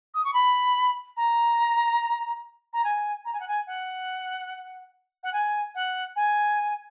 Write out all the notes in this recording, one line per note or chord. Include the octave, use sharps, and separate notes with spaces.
D#6
C#6
B5
A#5
A#5
G#5
A#5
G#5
F#5
G#5
F#5
F#5
G#5
F#5
G#5